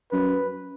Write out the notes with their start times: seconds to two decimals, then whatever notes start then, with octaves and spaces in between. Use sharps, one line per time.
0.12 F#2 B4